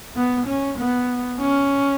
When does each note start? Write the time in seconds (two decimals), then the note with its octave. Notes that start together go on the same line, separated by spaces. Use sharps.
0.16 B3
0.47 C#4
0.79 B3
1.40 C#4